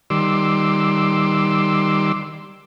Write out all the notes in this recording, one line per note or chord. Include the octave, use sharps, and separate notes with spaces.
D#3 G3 C6 D6 E6